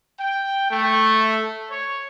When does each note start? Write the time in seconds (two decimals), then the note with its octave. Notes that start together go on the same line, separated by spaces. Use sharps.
0.19 G5
0.71 A3
1.71 C#5